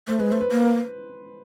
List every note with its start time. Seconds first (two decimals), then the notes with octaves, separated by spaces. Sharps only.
0.08 A3 C5
0.19 G#3 B4
0.30 A3 C5
0.41 B4
0.51 A#3